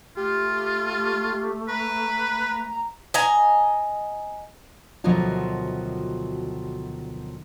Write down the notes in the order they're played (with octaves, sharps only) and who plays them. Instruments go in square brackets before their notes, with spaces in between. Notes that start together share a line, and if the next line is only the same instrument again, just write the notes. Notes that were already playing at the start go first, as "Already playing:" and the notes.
[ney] A3 [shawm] F4 [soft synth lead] G4
[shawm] B4 [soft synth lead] A#5
[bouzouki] D#5 G#5 A#5
[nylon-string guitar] D2 B2 D#3 F3 F#3 F4